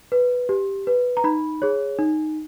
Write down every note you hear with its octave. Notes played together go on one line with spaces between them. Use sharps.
B4
G4
B4
A#5
D#4 B5
G#4 C#5
D#4